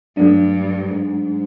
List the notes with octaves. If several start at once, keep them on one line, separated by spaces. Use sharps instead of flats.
G2 F#3 A3 D4
G#2